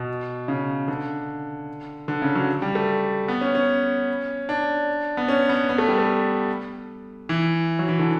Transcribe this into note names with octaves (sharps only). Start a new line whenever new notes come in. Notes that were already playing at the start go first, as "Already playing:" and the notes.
Already playing: B2
C#3
D3
D3
C#3
F#3
G3
A3
B3
C#4
C#4
D4
B3
C#4
B3
B3
A3
G3
A3
E3
F#3
E3
D3